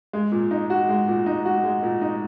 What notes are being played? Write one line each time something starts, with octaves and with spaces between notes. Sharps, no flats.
G#3
A#2
D#4
F#4
G#3
A#2
D#4
F#4
G#3
A#2
D#4